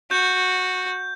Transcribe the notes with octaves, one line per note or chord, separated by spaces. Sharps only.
F#4 G6